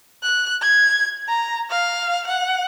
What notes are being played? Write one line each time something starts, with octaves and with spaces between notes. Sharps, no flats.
F#6
G#6
A#5
F5
F#5